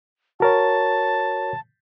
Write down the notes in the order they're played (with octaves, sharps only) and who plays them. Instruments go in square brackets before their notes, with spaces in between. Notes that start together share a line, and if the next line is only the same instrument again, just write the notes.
[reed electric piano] F#4 A#4 C#5 [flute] A5